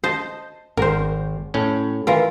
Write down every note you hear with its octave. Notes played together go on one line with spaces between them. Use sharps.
C5 D#5 A5
G#1 A#4 C5
A2 C#4
E3 F4 A#4